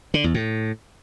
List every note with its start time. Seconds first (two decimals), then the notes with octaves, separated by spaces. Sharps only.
0.14 D3
0.24 E2
0.34 A2